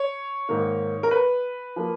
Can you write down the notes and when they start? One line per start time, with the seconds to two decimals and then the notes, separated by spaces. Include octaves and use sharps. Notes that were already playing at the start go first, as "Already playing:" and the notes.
Already playing: C#5
0.49 G#2 D#3 A#3
1.03 A#4
1.11 B4
1.76 F3 A#3